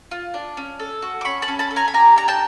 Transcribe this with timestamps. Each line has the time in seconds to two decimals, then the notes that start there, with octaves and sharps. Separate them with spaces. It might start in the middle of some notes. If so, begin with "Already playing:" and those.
0.11 F4
0.34 D4
0.57 C#4
0.80 A4
1.02 F#4
1.21 D6
1.25 C#4 B5 C#6
1.42 A5 B5
1.48 C#4
1.59 A5 B5
1.71 A4
1.76 G#5 A#5
1.88 B5
1.94 G4 G#5 A#5
2.16 D4 A#5
2.28 G5 A5